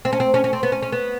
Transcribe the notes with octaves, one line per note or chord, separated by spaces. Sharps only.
C4
C#4
C4
C#4
C#4
C4
B3
C#4
C#4
B3